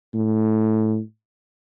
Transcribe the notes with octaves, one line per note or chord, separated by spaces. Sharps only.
A2